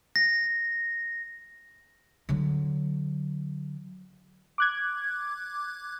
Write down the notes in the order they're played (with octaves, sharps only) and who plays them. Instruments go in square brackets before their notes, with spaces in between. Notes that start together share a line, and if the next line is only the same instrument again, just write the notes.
[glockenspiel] A#6
[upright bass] D3 F#3
[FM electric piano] D6 F#6 G#6